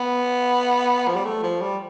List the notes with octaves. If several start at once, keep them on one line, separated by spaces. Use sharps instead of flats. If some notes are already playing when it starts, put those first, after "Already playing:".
Already playing: B3
F3
G3
A3
F3
G3